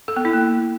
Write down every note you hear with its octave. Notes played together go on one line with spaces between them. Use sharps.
A4
B3
E4
A#3